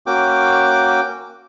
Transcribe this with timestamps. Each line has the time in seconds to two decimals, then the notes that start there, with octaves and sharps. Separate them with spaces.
0.06 A#3 C#4 F#4 G5 D6